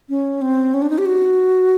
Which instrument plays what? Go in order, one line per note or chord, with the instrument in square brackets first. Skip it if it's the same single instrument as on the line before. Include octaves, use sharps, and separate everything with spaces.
[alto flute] C#4
C4
C#4
D4
D#4
G4
F#4